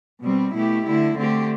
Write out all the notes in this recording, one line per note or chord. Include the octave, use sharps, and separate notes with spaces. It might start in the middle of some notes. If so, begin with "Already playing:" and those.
B2 G3 C4
B2 A3 E4 G4
D3 A3 E4
D3 A3 C4 G4